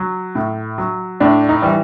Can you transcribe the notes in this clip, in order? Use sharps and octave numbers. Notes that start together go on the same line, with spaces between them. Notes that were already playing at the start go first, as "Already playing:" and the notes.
Already playing: F#3
A2
F#3
A2 D4
D#4
E3 G3